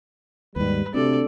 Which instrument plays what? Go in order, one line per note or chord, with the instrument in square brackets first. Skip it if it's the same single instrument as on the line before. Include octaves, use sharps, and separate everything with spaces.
[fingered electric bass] D#2 G#2 [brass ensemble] G3 [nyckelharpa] B4
[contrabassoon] D2 [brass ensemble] C3 [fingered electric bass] C4 [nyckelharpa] A4 D5